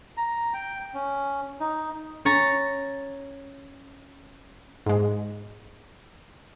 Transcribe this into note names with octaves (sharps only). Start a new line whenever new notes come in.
A#5
G5
C#4
D#4
C#4 C#5 A#5 A6 A#6
G#2 G#3